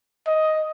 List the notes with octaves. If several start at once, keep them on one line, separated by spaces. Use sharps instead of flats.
D#5